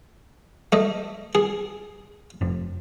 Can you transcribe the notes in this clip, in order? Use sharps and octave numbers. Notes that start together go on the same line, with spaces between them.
A3 D#5
G#4
F1